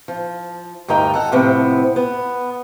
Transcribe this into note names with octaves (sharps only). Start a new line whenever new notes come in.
F3
D2 G2 D#4 A#4 G5
A4 F#5
A2 C3 F3 B3 C4
B3